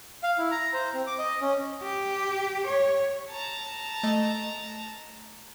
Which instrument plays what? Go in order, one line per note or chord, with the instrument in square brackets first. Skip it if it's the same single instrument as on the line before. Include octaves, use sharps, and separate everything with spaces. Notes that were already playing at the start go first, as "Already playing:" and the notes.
[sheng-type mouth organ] F5
E4
A#5
C5
C4
D6
D#5
C#4
[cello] G4
C#5
[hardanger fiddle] A5 A#5
[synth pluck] A3 D#5